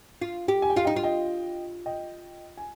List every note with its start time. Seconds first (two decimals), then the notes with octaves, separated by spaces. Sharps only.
0.22 F4
0.48 G4
0.62 G#5
0.70 G5
0.76 F4 F5
0.84 D#4 D#5 G5
0.96 F4
1.03 D#5 G5
1.86 D#5 G5
2.57 G#5